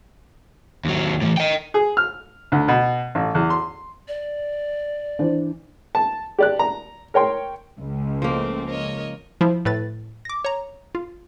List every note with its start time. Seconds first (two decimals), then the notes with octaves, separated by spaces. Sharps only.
0.85 D#2 F#3
1.21 A2 E3
1.37 D#5 G5
1.74 G#4
1.97 F6
2.52 D2
2.68 B2
3.15 A1
3.35 E2
3.50 C6
4.08 D5
5.19 E3 D4 C5
5.95 A5
6.39 G4 D5 F#6
6.59 A#5
7.14 A#4 C#5 G5 C6
7.78 C#2
8.22 F3 A3 A#3 C4
8.66 A#4 C#5 D#5
9.41 F3 E4
9.65 A2 B4 A6
10.25 D6 A#6
10.45 C#5 A#5
10.95 F4